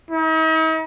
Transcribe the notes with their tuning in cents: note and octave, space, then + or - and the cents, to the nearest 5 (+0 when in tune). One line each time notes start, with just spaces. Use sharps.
D#4 +45